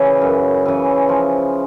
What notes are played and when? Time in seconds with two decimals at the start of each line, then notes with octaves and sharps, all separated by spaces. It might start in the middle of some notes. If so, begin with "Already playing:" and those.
Already playing: C#3 E3
0.21 F#2
0.65 C#3 E3
1.09 F3